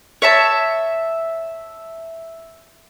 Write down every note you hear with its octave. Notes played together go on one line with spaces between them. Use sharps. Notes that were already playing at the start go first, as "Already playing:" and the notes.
C#5 E5 A5